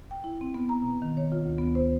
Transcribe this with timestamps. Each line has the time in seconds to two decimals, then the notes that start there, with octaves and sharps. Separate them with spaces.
0.11 G5
0.24 E4
0.41 C4
0.54 B3
0.69 A#5
0.82 B2
1.02 D#3
1.17 C#5
1.32 F4
1.45 D2
1.58 B3
1.75 C5